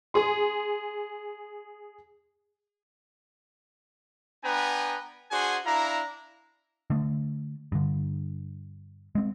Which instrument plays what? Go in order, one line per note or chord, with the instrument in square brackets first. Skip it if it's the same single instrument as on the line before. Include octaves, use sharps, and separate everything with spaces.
[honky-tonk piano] G#4 C6
[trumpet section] B3 D4 B4 G5 G#5 A#5
D4 F#4 G#4 C5 F#5 G#5
D4 E4 F5 A#5
[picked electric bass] D3 A3
G2 D3
G#3 C4